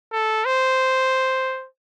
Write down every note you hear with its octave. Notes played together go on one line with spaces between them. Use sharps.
A4
C5